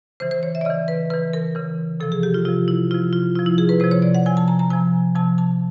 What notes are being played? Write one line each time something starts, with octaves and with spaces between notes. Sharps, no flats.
C#3 E3 C5
C5
C#5
E5
D5
C#3 E3 D#5
B4
C#3 E3 B4
A#4
C#3 E3
C3 F3 A4
G#4
G4
F4
C3 F3 F4
E4
C3 F3 F4
F4
C3 F3 F4
E4
G#4
B4
C3 F3 C5
C#5
D5
F#5
C3 F3 G#5
A5
A#5
A#5
C3 F3 G#5
C3 F3 A5
A5